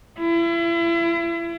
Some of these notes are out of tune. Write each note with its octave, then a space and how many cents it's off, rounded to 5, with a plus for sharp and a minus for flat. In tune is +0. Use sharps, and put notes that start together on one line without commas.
E4 +35